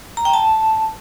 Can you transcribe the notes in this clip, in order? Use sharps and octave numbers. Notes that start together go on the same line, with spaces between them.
A#5
G5
A5